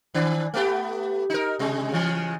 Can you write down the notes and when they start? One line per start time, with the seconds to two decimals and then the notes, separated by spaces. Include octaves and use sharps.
0.15 D#3 D4
0.54 A3 B3 G4
1.30 D#4 A#4
1.59 C3 G#3
1.92 C#3 E3 G#3